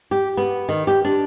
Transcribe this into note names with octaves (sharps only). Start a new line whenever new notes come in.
G4
B3
D#3
G4
D4